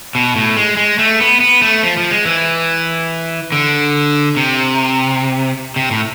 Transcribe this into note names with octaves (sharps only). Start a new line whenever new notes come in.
B2
A2
G#3
G#3
A3
B3
B3
A3
F3
F3
G#3
E3
D3
C3
C3
A2